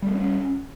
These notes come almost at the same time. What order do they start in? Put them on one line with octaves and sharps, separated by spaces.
G3 A3 A#3 C#4